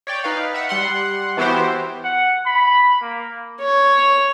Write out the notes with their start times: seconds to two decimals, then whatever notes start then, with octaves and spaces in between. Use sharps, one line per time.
0.07 C#5 D5 G5
0.24 D#4 B4 F5
0.54 E5 F#5
0.69 G3 F#5 C6
1.37 E3 B3 E4 F#4 G4 C5
2.04 F#5
2.46 B5
3.01 A#3
3.61 C#5